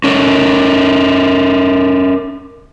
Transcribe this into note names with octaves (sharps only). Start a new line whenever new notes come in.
C#4 A4 A#4